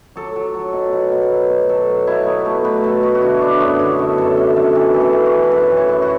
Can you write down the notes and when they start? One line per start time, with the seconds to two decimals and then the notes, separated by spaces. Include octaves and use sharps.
0.16 F#3 A4
0.36 F#3
0.55 F#3
0.73 B2
0.93 B2
1.12 B2
1.31 F#3
1.50 B2
1.69 F#3 A4
1.88 F#3
2.07 B2 E4
2.26 F#3 B3
2.45 B2 A3
2.64 B2 B4
2.84 B2 A4
3.03 B2 F#4
3.15 F#4
3.22 D3 E4
3.40 F#3 D4
3.60 F#2 B3
3.79 D3 E4
3.99 F#2 F#4
4.18 F#2 A4
4.37 F#2 A4
4.56 F#2 A4
4.75 E3 A4
4.94 E3
5.00 A4
5.13 E3
5.26 F#4
5.32 E3
5.44 B4
5.51 F#2 A4
5.70 E3
5.77 E4
5.89 F#2
6.02 F#4